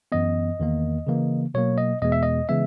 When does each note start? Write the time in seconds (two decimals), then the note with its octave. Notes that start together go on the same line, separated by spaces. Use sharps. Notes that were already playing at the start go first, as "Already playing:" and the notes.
0.12 F#2 E3 B3 D#5
0.60 E2 D#3 A#3
1.07 C#3 E3 A#3
1.54 B2 F#3 A#3 C#5
1.78 D#5
2.02 E2 B2 G#3 B3 D#5
2.12 E5
2.23 D#5
2.49 C#3 E3 G#3 B3 E5